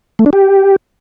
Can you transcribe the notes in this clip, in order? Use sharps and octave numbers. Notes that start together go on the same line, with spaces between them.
A3
D4
G4